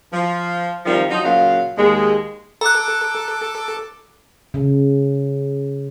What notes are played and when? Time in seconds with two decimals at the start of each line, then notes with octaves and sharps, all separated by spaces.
0.12 F3
0.85 C3 D#3 F3 G3 F4
1.10 F3 F#3 D#4
1.24 A#2 C#3 F#3 F5
1.77 D#2 G#3
2.61 A4 A#5 D6 F#6
4.54 C#3